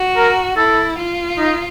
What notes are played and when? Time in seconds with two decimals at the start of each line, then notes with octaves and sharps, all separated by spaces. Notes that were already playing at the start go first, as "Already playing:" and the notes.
Already playing: F#4
0.16 A#4
0.56 E4 A4
0.98 F4
1.38 D#4